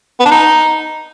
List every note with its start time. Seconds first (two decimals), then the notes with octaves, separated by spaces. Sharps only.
0.20 B3
0.26 D4
0.32 D#4